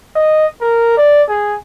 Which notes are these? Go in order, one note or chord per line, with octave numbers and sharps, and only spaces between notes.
D#5
A#4
D5
G#4